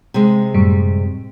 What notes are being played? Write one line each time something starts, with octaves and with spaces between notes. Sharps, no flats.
C3 G#3
F#2 A2 G3